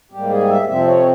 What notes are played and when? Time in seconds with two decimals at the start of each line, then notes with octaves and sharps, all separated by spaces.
0.12 G#2 G3 A#3 G4
0.31 G#4
0.49 E5
0.68 F2 C3 F3 C4 E5
0.88 C#5